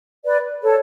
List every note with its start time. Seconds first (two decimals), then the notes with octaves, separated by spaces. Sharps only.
0.25 B4 D5
0.63 A4 C#5